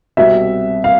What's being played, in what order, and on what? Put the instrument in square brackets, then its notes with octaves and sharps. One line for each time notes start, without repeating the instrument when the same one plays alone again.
[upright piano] C2 B2 G3 C4 E5
F5